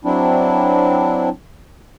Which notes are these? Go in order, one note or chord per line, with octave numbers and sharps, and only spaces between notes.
F#3 C4 D4 E4